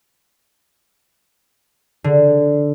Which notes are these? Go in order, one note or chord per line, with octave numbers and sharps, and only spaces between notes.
D3